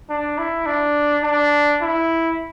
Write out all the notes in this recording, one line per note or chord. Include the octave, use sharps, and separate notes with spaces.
D4
E4
D4
D4
E4